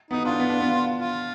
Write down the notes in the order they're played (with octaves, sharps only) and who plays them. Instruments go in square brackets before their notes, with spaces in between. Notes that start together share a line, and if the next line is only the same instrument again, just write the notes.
[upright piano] B3 [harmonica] D#4
[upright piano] D4 [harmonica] F4
[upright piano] B3
D4
B3
[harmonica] F4